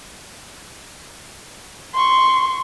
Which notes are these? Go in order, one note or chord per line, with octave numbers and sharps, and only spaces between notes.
C6 C#6